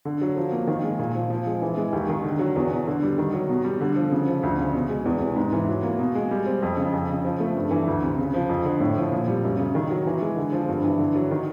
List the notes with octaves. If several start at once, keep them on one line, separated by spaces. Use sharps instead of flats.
D3
F#3
F3
A#3
D#3
G#3
A#2
F3
F3
G#3
E3
G#3
D#2
D#3
D3
F#3
E2
B2
D3
G3
D#3
F#3
B2
G3
D3
F3
C#3
F3
D2
C#3
B2
G#3
E2
C3
G#2
E3
F#3
A#3
B2
G#3
G3
C4
F2
C#3
F2
C#3
F3
A3
G2
E3
D2
C3
C#3
F3
F2
D3
A2
F3
A#2
G3
F#2
C#3
D#3
F#3
E3
G#3
D3
F3
G2
E3
D3
F#3
D#3